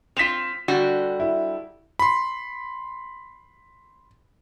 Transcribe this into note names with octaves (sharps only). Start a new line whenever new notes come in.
C4 F4 B6 E7 F7
D3 G3 F#4
E4
B5 C6